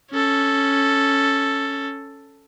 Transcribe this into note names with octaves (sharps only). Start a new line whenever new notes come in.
C#4 A4